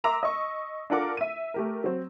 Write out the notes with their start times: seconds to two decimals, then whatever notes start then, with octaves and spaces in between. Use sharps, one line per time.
0.04 A#4 E5 A#5 C6 D6 E6
0.23 D#5 C#6
0.90 D4 F4 A4 A#4 F#5 D6
1.17 E5 D#7
1.54 A3 G4 A#4
1.84 F#3 C4